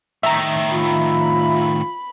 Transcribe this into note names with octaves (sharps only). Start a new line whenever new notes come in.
A2 D#3 E5 A#5
F4 B5